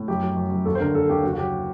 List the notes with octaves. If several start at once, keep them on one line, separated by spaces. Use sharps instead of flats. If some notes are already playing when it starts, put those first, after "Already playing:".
Already playing: A2
F#2 G4
F#3
F#2
F#2
D#2 A4
C5
D3 A#4
D#2 A4
D#2 G4
F#1 F#4
F#4
F#3 G4